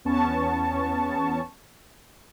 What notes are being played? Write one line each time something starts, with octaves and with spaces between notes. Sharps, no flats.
E2 B3 C#4 A5 C#6